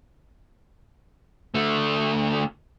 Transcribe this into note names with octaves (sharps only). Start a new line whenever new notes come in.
D3 A3